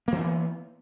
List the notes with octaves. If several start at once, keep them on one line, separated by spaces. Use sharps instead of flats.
E3 A#3 B3 D4